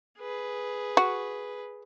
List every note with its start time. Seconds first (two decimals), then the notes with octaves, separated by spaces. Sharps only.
0.18 G#4 B4
0.97 F#4